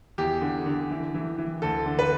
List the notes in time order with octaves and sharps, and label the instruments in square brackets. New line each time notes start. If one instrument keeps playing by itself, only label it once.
[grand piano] E2 G4
D3
D3
E3
E3
E3
D2 A4
D3
B4